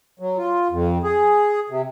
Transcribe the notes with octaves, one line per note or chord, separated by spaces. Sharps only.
F#3
F4
F2
G#4
C3